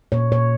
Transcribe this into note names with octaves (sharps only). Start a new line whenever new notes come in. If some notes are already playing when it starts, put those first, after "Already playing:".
A#2 C#5
A#2 C#5